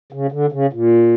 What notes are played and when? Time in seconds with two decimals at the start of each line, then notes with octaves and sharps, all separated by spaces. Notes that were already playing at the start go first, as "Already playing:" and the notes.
0.13 C#3
0.32 D3
0.52 C#3
0.73 A#2